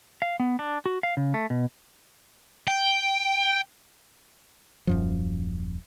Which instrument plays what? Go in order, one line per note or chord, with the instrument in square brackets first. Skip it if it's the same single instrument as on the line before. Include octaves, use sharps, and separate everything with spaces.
[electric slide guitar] F5
B3
D4
F#4
F5
C#3
A3
B2
[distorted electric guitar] G5
[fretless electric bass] D#1 F#2 F3